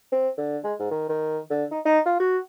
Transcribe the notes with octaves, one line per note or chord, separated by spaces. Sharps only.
C4
D3
G#3
G#2
D#3
D#3
D3
D#4
D#4
F4
F#4